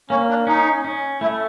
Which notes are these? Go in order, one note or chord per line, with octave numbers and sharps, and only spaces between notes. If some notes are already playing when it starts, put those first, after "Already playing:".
A#3 C#4
D4
C#4 D#4
C#4
A3 E4